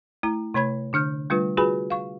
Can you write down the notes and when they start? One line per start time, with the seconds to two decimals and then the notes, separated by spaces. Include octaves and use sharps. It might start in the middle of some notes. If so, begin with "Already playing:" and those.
0.23 A3 E4 A#5
0.54 C3 A3 C#5 B5 G#6
0.93 D3 D4 F6 G6
1.30 G3 A3 D4 F4 B4
1.57 F4 F#4 G#4 B4 G#5 B5
1.90 F5 C#6